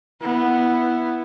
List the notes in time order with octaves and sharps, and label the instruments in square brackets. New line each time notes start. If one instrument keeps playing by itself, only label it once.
[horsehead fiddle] B3 E4